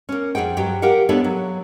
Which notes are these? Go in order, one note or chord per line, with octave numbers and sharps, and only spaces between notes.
A#3 C#4
F2 C#3 G#4 F#5 G5
G2 F#3 G4 G5
G4 A#4 F5 F#5
B3 D4 E4 A4 C#5 E5
F#3